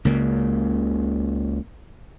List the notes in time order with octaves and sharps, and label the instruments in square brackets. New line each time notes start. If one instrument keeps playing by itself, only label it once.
[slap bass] C#2 C#3 A#3